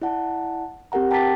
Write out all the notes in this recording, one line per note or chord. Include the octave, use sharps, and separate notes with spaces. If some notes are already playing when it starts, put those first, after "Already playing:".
E4 D5 F#5 A5
C4 G4 A#4 F#5 A#5
G5 A5 A#5 D6 A6 B6